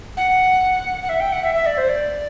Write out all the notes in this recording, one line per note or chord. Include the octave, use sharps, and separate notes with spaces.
F#5
F#5
E5
G5
F#5
E5
E5
D5
C5
D5